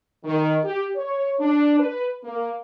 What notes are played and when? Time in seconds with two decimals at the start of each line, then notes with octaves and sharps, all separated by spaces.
0.24 D#3
0.64 G4
0.96 C#5
1.40 D4
1.79 B4
2.24 A#3